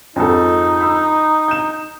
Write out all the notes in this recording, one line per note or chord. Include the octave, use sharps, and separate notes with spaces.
F2 G#2 D#4 A4
B5 E6
G6 E7